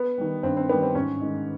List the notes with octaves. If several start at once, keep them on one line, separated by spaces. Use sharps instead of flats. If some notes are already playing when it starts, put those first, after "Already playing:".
Already playing: B3
D#3 G3
G2 C4
C4
D#3 G3 B3
C4
G#2 C#4
D#3 G#3